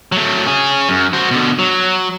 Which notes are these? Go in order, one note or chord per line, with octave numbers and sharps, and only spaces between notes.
F#3 A3
C#4 G#4
F#2
F#4 C5
B2 D3
F#3